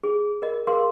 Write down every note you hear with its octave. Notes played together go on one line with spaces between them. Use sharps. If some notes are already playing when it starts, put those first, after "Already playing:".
G#4
A#4 D#5
G#4 A#4 F5 C6